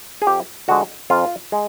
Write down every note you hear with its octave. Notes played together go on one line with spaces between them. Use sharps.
G#4
F2 G4
D3 F3 G#3 F#4
F2 F4
G#3